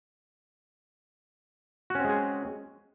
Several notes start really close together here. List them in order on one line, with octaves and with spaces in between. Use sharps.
F#4 C#4 C4 G#3 G#4